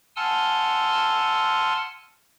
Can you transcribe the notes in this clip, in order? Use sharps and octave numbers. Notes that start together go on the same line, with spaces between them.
F#5 G#5 A5 C6 E6 F6